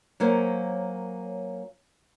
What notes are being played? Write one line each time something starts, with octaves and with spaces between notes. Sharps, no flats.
F#3 A#3 C#4 A#4 C5